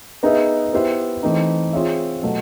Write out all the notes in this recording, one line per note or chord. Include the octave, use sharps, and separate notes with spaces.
B3 D#4 G#4 B4 E5
B3 E4 G4 C5 E5
E3 A3 C4 D#4
C4 F4 G#4 C#5 E5
B2 F#3 A3